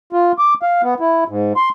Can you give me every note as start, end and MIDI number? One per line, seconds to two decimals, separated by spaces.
0.13 0.32 65
0.39 0.54 86
0.62 0.82 77
0.83 0.94 59
1.00 1.24 64
1.28 1.53 44
1.56 1.69 84